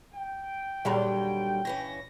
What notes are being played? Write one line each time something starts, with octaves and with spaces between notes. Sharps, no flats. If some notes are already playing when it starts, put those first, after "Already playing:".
G5
D#2 A#2 D3 F#3 G3
G2 E3 C#4 A#6